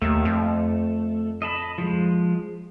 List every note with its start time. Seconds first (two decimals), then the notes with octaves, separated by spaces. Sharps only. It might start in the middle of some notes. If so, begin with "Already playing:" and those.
0.02 D#2 A3
0.25 F2
1.42 D#5 A5 B5
1.78 F3 G#3